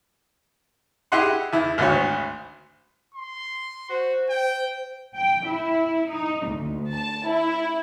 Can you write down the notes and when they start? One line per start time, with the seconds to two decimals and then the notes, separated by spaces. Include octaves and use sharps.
1.12 E4 G4 G#4 D#5 F#5 C6
1.53 E2 E4
1.78 G#1 D2 F#4 C#5
3.14 C6
3.89 F#4 C5
4.30 G5
5.16 G5
5.49 E4
6.09 D#4
6.47 D2
6.93 A5
7.28 E4